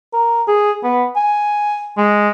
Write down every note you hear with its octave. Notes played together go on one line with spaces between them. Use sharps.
A#4
G#4
B3
G#5
G#3